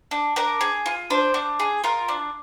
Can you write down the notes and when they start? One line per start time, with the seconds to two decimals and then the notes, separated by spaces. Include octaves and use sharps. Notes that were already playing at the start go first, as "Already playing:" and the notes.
0.11 D4
0.36 D4 A#4
0.61 G#4
0.86 F4
1.10 D4 C5
1.34 D4
1.60 G#4
1.84 F4 A#4
2.08 D4